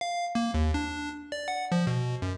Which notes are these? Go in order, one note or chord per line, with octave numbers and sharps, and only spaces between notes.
F5
A#3
D#2
D4
D5
F#5
F3
B2
F#2